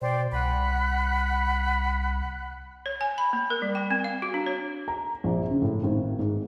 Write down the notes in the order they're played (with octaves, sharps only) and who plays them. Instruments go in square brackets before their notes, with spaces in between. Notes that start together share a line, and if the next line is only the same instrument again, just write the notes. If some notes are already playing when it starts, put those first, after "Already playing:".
[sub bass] B2 [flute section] C5 D5 G5
[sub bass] C2 [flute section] F#5 B5 F#6
[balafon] C#5
G#5
B5
A#3
A#4
G3
G5
C4
F5
F#4
D4
C#5
[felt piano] A#5
A#1
C#3
A2
G#1
G#2